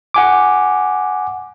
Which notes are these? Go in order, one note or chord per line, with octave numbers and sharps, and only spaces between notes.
F#5 G#5 D6